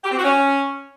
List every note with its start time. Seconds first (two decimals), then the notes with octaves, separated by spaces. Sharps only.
0.04 G4
0.10 C4
0.16 F#4
0.23 C#4